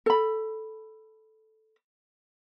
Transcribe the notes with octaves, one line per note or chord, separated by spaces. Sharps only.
A4 B5